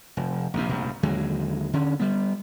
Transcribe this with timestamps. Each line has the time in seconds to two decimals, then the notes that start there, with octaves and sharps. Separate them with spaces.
0.17 F1
0.54 A#1 D#2 C3
0.69 F1 A#1 G2
1.03 D#2 D3 F#3 G#3
1.73 D3 C#4
2.00 G3 B3